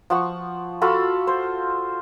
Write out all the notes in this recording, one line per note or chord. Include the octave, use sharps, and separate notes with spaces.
F3 F#5 C#6
F4 F#4 A4 B5
C5